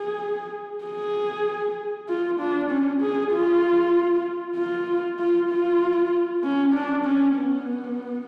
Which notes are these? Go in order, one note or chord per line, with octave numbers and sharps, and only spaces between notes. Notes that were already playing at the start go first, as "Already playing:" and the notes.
Already playing: G#4
G#4
F4
D4
C#4
G#4
F4
F4
F4
F4
C#4
D4
C#4
B3